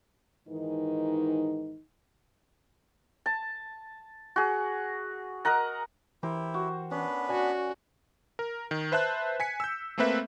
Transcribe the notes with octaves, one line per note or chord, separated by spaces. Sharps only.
G#2 D#3 E3 D#4
A5
F#4 G#4
A#4 D#5 F#5 A#5
E3 E4 G4 A#4 C5
F#4
B3 C#4 D4 B4
F#4 D5 G#5
A#4
D#3
B4 C5 E5 A5 F#6
G#5 B6 C#7
E6 G6
A3 A#3 C4 A4 B4 E5